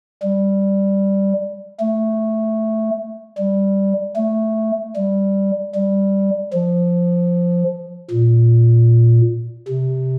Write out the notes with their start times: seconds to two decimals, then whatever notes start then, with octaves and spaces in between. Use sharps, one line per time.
0.23 G3
1.80 A3
3.38 G3
4.17 A3
4.96 G3
5.75 G3
6.53 F3
8.11 A#2
9.69 C3